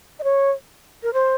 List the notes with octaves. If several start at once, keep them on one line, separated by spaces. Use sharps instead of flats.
D#5
C#5
A#4
C5